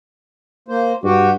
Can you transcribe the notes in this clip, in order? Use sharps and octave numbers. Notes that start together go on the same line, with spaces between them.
A#3 C5
G2 F#4 G4